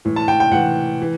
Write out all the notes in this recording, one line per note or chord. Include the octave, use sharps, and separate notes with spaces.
A2 E3
A5
G5
G5
A2 E3 F#5
E3